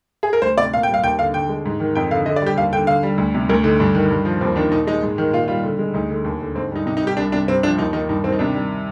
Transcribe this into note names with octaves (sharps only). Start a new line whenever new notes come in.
G#4
A#4
D2 C5
C3 D5
A#2 F5
G5
G3
F5
D#2 G5
D3 F5
D3 G5
G#3
G#2
D#3
F2 G5
D3 F5
D3 D#5
D5
G3 G4
D#2 F5
D3 G5
D3 F5
G3
D2
C3
D2 A#4
D3 D#4
G2 D4
D#3
G2
F3
D#2 C4
D#3 D4
A#2 D#4
G#3 D#4
G#2
D#3
A#2 F4
G3 F4
D3
G#3
D2 D#4
D3
D#2
D3
G#2 C4
G3 D#4
C3 D#4
D#4
G3 G4
C2 D4
C3 D4
G2 C4
F3 D4
D#2 D#4
D#3 D#4
G2 D#4
D#3 C4
D#4
C3 D4
G3